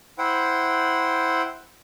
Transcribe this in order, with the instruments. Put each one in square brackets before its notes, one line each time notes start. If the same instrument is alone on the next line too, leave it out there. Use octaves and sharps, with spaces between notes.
[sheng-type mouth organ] E4 C5 F#5 G5